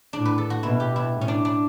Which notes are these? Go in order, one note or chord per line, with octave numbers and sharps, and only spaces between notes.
A2 D4
B4
A4
F#4
B2 E4
G4
E4
A2
C#4
D4
D4